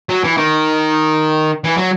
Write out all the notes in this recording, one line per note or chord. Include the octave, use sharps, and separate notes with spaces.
F#3
E3
D#3
E3
F#3